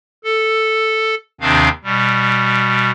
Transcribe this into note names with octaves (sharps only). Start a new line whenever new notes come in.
A4
D#2 C3 D#3 C4 D4 F5
B2 G3